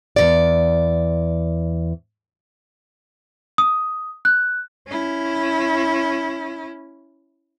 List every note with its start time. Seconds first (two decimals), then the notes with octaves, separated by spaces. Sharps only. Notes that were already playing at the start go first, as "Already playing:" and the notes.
0.16 E2 B2 D5
3.58 D#6
4.25 F#6
4.88 C#4 E4